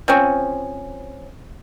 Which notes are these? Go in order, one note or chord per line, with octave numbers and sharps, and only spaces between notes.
F3 C4 C#4